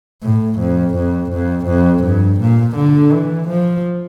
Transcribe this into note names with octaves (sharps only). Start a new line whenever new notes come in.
A2
F2
F2
F2
F2
G2
A#2
D3
E3
F3